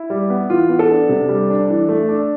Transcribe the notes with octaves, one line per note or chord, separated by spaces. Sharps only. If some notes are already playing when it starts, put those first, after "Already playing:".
Already playing: E4
G3
B3
E3 F4
B3
A4
D4
C3
G3
D4
E3
A3
D4